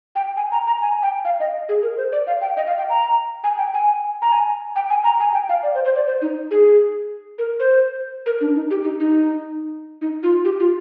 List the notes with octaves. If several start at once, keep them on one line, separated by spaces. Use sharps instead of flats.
G5
G#5
A#5
A#5
G#5
G5
F5
D#5
G#4
A#4
C5
D5
F5
G5
D#5
F5
G5
A#5
G#5
G5
G#5
A#5
G#5
G5
G#5
A#5
G#5
G5
F5
D5
C5
C5
D5
C5
D#4
G#4
A#4
C5
A#4
D4
D#4
G4
D#4
D#4
D#4
F4
G4
F4